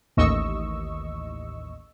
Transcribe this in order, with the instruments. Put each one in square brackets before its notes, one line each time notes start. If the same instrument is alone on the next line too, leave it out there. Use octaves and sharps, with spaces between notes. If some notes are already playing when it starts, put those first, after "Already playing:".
[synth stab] A1 D#2 D#5 C#6 E6